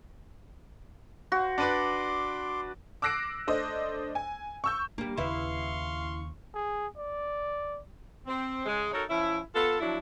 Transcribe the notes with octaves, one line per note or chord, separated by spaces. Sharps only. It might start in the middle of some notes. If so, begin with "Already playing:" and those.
F#4 C5
D4 B4 D5 C6 D6
D6 E6 F#6 A#6 C7 D7
A3 D4 C5 D#5
G#5
C#6 E6 G6
G3 A#3 D4
D#2 C#3 E4 B4 E5 F5 C6 C#6
G#4
D5
C4
C#3 G#3
D#4 F#4 A4 A#4 C#5
F3 C#4 E4
B3 F4 A4
F3 F#3 D4 E4